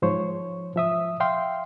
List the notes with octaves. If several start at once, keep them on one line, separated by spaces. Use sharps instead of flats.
G#2 F3 C5 C#5 C#6
F3 E5 D#6
E5 F5 G5 C6